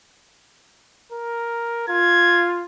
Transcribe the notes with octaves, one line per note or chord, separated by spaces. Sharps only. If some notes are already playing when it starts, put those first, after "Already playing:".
A#4
F4 G#6